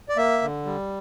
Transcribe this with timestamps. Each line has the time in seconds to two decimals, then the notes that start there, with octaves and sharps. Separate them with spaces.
0.09 D5
0.17 A#3 E5
0.42 D3
0.65 G3